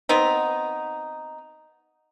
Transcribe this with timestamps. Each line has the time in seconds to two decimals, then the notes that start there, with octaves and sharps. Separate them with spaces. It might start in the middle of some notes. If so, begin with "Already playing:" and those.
0.09 B3 C4 D#4